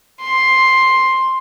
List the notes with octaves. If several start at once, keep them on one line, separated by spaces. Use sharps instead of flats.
C6